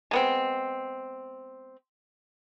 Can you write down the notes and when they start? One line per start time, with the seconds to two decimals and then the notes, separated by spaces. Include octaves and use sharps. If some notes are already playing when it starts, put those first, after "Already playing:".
0.11 G#3 B3 C4